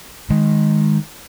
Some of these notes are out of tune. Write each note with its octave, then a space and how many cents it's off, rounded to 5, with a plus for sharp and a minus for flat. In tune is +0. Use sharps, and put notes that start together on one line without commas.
D#3 +0 G#3 +0